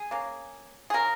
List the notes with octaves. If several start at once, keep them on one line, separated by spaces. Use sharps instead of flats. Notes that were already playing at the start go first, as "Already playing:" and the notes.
Already playing: G#4
C#3 A#3
G#4
C#3 A#3 A#4